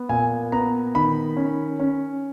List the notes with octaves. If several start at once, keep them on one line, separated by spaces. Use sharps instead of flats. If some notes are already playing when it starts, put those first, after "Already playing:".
Already playing: B3
A#2 G#5
B3 A#5
D#3 B5
C#4
C#4